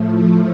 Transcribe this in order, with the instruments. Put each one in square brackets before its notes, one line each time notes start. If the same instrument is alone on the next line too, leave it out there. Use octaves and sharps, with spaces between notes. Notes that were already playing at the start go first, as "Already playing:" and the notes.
Already playing: [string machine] A2 F3 A3